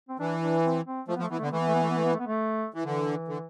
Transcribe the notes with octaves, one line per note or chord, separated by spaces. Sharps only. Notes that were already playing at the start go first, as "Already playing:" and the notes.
C4
E3 D4
D4
C4
C4
F3 A3
B3
F3
A3
E3 B3
A3
D3
B3
E3 A3
B3
A3
B3
A3
B3
A3
B3
A3
B3
A3
E3
D3 E3
D3